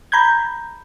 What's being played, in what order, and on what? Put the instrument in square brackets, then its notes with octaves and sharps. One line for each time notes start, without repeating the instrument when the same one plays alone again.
[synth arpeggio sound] A#5 B5 G6 G#6